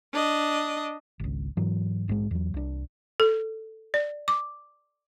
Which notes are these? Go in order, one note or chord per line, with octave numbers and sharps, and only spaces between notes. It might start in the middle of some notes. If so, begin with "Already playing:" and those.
D4 D#5
G#1 C#2
G#2 E3 F#3
A#1 G#2 D#3 G#3
E2 F#3
C2 D4
A4
D5
D6